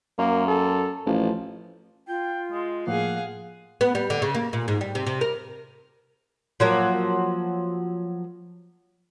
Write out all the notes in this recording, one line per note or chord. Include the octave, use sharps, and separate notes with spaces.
F#2 A#3
A4
A1 F3
F4 G5
G#3
A2 F3 A#3 G#4 F5 F#5
B3
G3
D3
C#3
A#3
A#2
G#2
G3
C3
C3
A#4
F3 F#3 A#3